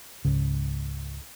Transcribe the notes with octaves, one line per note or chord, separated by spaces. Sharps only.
C#2 G#2 C#3